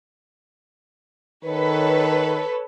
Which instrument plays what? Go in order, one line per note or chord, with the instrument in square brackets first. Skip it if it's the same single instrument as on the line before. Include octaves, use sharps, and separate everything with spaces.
[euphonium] D#3 [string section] A4 B4 C#5